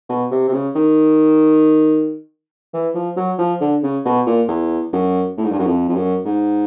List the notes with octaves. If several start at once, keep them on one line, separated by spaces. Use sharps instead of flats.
B2
C3
C3
C#3
D#3
E3
F3
F#3
F3
D3
C#3
B2
A#2
E2
F#2
A2
G#2
G2
F#2
F2
F2
F#2
G#2